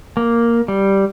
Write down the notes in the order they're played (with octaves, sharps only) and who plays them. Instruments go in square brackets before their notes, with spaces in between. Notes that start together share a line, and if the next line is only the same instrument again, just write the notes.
[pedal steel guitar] A#3
G3